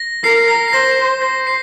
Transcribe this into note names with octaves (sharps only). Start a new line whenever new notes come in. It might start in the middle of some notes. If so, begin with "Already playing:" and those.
Already playing: A#6
A#4 C7
A#6
C7
C5 A#6
C5 A#6
C7